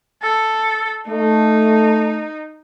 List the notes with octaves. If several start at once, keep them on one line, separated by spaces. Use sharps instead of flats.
A4
A3 D#4